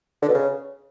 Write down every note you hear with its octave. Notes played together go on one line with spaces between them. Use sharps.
D3
B2
C#3